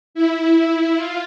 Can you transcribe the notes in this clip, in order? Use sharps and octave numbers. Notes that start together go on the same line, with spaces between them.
E4
F4